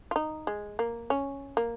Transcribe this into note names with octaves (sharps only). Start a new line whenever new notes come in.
F4
D#4
G#3
A#3
C#4
A#3